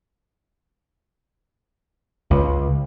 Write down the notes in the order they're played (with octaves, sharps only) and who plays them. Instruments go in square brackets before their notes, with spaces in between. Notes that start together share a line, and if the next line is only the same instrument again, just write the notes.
[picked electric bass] C#2